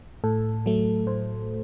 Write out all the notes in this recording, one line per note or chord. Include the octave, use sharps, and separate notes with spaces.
A2 A4
F#3 A3
A2 C5